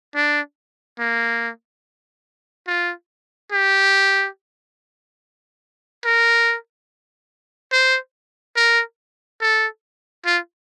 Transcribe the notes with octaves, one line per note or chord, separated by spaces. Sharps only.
D4
A#3
F4
G4
A#4
C5
A#4
A4
F4